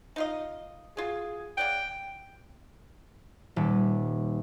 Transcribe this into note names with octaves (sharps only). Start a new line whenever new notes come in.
D#4 F4 D#5
F#3 F4 G#4
C#3 D5 F#5 G5
D#1